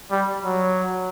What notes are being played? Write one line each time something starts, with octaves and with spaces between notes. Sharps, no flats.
G3
F#3